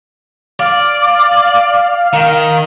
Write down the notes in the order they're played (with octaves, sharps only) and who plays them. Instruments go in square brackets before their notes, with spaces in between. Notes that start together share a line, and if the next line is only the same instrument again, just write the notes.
[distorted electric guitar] D5 [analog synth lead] F5
[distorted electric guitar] D#3